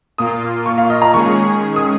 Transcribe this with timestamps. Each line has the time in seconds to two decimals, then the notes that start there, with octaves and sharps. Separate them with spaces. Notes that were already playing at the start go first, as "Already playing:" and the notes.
0.18 A#2 A#3 F4 D#6
0.66 C#6
0.78 F5
0.90 D#5
1.02 A#5
1.13 D#3 G#3 C#4 G#4 C#6
1.76 D#6